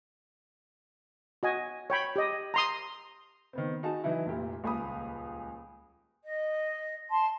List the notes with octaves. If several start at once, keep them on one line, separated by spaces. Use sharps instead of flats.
F#4 D#5 G#5
C#5 G5 B5
G4 D#5
A#5 C6 D#6
D#3 B3 C4
D#4 F#4 G#4 A5
E3 F#3 D#4 E4
F1 A#2 G4
D#1 C#2 G#4 G#5 B5 D#6
D#5
A5 C6